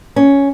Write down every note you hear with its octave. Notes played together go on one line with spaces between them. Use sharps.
C#4